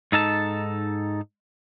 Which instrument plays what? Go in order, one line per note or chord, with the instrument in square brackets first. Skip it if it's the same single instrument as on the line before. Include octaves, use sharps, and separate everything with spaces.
[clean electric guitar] G#2 D#4 A4 A5